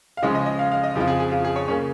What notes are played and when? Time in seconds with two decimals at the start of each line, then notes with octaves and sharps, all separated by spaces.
0.17 F5
0.22 C#3 F3 G#3 C#4 D#5
0.35 D#5
0.46 D#5
0.59 F5
0.72 F5
0.84 D#5
0.95 F2 C#3 F3 F4
1.07 G#4
1.20 G#4
1.32 F4
1.44 G#4
1.56 C#5
1.68 C#3 A#3 C#4